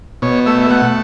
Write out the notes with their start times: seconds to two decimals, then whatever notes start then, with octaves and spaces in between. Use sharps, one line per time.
0.22 B2 C#5
0.46 A3 E5
0.62 E5
0.70 A3 F#5